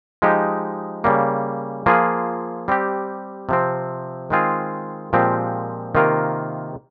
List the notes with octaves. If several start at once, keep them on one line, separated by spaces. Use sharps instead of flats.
F3 G#3 D#4 G4
C#3 G3 A#3
F3 A#3 F4 G#4
G3 C4 G4
C3 F3 C4
D#3 G#3 C4 F4 G#4
A#2 F3 G#3 C4 G4
C3 D#3 A#3 F4 A#4